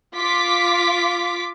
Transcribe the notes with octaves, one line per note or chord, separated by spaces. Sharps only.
F4 D6 B6